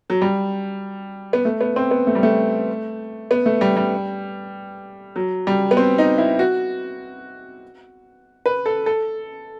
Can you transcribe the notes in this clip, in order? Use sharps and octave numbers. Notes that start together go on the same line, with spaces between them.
F#3
G3
B3
A3
B3
C4
B3
A3
G3
A3
B3
A3
G3
G3
F#3
G3
B3
C4
D#4
E4
F#4
B4
A4
A4